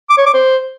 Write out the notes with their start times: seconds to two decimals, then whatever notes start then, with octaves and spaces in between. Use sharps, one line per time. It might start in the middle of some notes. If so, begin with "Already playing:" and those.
0.10 D6
0.18 C#5
0.26 D6
0.34 C5